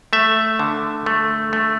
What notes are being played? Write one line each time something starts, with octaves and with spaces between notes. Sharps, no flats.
A3 E5
D3
A3
A3